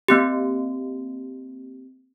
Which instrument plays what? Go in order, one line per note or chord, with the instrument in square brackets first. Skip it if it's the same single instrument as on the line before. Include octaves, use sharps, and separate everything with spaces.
[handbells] A#3 C4 G4